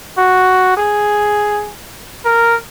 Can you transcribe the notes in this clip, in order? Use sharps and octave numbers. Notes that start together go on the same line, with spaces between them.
F#4
G#4
A#4